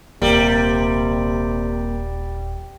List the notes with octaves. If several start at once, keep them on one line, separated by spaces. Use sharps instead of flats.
D#1 C3 G3 A#3 A#4